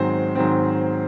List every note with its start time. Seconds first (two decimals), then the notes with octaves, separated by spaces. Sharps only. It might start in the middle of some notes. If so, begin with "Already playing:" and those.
Already playing: G#2 D#3 F#3 C4 C5
0.35 G#2 D#3 F#3 C4